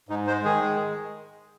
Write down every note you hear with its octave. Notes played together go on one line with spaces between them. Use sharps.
G#2 D#4
G#3 C5
D#3 G#4
G#3